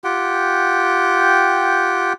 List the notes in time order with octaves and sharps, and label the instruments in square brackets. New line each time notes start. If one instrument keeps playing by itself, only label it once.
[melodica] F4 G4 F#5 G5